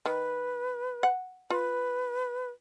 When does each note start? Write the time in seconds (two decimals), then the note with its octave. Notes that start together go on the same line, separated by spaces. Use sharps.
0.06 D#3 B4
1.03 F#5
1.50 F4 B4